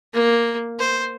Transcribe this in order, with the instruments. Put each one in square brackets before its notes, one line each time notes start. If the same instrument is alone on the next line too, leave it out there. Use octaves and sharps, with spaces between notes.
[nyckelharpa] A#3
C5